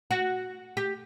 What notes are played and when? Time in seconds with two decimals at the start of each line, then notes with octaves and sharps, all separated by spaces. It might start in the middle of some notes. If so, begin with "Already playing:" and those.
0.11 F#4
0.77 G4